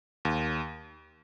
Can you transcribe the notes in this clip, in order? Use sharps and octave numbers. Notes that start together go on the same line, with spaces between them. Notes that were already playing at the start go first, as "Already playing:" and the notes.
D#2